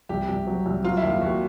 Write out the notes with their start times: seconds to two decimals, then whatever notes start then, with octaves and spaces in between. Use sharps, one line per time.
0.09 C2 G4
0.28 C2
0.47 F#3
0.66 C2
0.84 F#3 F4
0.97 E4
1.03 D#2
1.10 F4
1.22 D#2 F#4